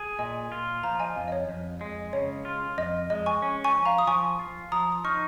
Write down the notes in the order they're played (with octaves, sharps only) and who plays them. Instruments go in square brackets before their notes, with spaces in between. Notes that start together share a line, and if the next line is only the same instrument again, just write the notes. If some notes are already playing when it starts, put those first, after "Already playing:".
Already playing: [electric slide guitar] G#4
[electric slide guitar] A#2 [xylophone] D#5 G#5
[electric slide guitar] F4
[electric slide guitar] F3 [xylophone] F5 A#5
[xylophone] D#5 G#5
[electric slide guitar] F2 [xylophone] F5
[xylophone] D#5
C#5
[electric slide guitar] F2
G#3
[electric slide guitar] C#3 [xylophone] C#5
[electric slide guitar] F4
[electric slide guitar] F2 [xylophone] D#5
[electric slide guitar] G#3 [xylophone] D#5
[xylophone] G#5 C#6
[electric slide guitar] C#4
[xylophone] G#5 C#6
[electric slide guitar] F3
[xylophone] F5 A#5
D#6
[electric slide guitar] F3 [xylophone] G#5 C#6
[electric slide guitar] F4
[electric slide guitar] F3 [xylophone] A#5 D#6
[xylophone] D#6
[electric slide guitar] D#4 [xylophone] C#6 F6